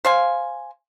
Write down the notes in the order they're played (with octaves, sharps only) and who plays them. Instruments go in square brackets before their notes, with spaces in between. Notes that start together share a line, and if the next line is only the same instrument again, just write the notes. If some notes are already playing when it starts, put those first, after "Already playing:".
[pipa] C5 F5 G#5